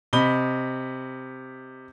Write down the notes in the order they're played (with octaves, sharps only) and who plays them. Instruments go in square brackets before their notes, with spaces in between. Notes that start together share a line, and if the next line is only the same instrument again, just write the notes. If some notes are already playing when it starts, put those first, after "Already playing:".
[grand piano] C3 D#5 B5 G7